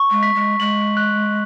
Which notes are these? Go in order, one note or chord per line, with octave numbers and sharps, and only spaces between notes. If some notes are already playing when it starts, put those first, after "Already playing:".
Already playing: C#6
G#3
B6
G#3
G#3 F#7
F#6